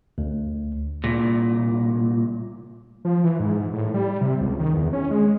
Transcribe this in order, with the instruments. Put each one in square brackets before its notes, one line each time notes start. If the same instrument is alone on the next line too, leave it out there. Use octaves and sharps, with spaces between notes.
[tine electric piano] D2
[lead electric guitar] C2 A#2
[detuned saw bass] F3
E3
G#2
A2
G3
C3
C#2
D#3
E2
C#4
G#3